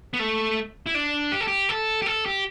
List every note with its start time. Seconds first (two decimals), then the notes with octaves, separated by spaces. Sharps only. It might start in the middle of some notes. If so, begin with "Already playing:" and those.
0.14 B3
0.19 A3
0.86 E4
0.95 D4
1.32 G4
1.41 A4
1.48 G4
1.69 A4
2.02 G4
2.06 A4
2.26 G4